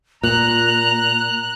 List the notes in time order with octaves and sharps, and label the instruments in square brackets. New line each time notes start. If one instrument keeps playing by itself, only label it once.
[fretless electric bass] A#2 [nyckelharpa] A#5 [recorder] F#6 [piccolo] F7